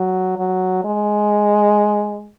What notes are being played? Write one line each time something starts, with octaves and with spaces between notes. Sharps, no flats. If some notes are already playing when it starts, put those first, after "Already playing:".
Already playing: F#3
F#3
G#3